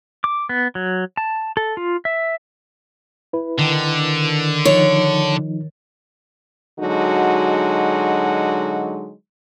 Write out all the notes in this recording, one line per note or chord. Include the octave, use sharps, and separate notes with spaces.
D6
B3
F#3
A5
A4
F4
E5
E4 B4
D3 D#3
F3 D#4 C#5
D3 F#3 G#3 D#4 F#4